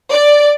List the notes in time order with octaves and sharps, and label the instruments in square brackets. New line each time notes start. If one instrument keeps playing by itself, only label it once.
[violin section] D5